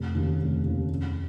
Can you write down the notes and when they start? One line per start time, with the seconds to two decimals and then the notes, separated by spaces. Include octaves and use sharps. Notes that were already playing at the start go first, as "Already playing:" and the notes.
Already playing: F1
0.15 D#2 C#3
0.40 F1
0.65 D#2 C#3
0.89 F1